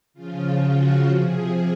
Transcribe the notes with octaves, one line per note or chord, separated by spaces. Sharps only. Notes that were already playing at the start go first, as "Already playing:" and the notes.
C#3 F3 F4
F#4
C3 F3 G#4